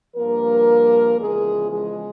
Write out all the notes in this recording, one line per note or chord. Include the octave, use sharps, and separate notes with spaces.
G2 F3 A#3 A#4
E2 C#3 F3 G#3 G#4
G#3 G#4